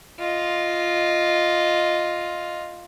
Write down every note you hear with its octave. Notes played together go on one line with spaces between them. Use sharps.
F4 D#5